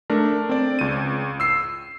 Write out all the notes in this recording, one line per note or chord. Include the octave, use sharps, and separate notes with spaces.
A3 D4 A#4
C4 D5
C#2 D#7
E6 C7